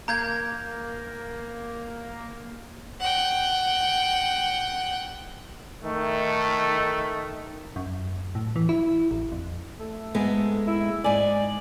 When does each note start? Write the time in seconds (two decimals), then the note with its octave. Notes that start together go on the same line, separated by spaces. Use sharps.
0.08 A#3 A#5 G6 G#6
3.00 F#5 G5
5.84 D#3 A3
7.76 F#2
8.35 A2
8.56 E3
8.69 E4
9.11 A1
9.32 F2
9.79 A3
10.15 G#2 G#3 B3
10.67 E4
11.04 G#2 D5 G#5